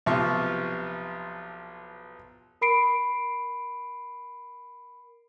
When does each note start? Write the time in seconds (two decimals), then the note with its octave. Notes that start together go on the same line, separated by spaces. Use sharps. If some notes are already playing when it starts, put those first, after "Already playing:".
0.06 B1 C3 F3 F4 C#6
2.61 A#4 B5 C7 D7